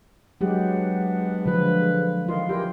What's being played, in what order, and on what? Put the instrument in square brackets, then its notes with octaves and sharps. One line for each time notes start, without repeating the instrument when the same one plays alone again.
[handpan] F#3 G4 [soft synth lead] G#3 [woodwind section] B3 D4 F#5
[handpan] D3 F3 [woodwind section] B4
[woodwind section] D#3 [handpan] F4 [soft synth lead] C6
[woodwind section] E2 A#4 G5 [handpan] G4